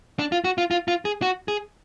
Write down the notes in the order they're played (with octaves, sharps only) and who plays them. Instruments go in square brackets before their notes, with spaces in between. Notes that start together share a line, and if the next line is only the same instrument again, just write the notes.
[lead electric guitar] D4
F4
F#4
F4
F4
F4
G#4
F#4
G#4